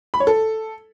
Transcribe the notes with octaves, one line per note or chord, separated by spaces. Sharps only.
B5
C#5
A4